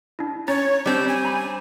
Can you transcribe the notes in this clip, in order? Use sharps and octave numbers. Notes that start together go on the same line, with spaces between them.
D4 E4
C#4 C#5 A#5 A6
G3 C4 D4 D5 G6
G#5
A#5 B5